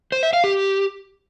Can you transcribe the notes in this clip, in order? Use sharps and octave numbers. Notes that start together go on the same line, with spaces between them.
C5
E5
F5
G4